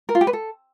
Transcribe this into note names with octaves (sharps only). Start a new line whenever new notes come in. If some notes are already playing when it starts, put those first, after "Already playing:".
A#4
F4
G4
B4
A4